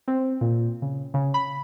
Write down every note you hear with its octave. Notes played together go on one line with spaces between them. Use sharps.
C4
A#2
C#3
C#3
B5